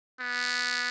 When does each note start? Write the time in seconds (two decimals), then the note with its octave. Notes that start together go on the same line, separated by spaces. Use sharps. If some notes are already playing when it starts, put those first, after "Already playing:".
0.20 B3